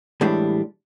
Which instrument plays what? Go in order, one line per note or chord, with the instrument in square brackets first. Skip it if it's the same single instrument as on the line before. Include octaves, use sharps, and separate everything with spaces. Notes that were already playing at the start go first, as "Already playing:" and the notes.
[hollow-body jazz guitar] A2 E3 G3 G#3 D4